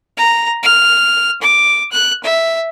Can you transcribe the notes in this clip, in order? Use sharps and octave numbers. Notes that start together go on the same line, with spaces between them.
A#5
F6
D6
F#6
E5